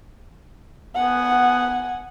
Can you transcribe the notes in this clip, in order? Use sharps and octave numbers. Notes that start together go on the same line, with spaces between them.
B3 F#5 G#5